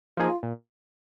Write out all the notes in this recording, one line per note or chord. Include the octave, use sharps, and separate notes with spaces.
F3 A#3 D#4 F4 G#4
A#2